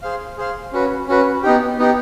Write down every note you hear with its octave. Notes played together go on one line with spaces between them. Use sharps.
G#4 C5 F5
G#4 C5 F5
C#4 F#4 B4
C#4 F#4 B4
B3 D#4 G4
B3 D#4 G4